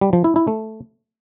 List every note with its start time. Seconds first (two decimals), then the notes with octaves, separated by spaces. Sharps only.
0.01 G3
0.13 F3
0.24 E4
0.36 E4
0.47 A3